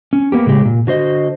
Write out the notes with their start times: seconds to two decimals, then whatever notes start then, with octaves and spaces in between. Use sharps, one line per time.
0.13 C#4
0.32 A#3 B3 G4
0.46 A2 C#3 G#3 G4
0.65 A#2
0.87 D3 F#4 C5 D#5